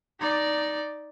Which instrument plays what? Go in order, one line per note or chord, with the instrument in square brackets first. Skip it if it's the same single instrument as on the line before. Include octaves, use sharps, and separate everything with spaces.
[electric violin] D#4 D5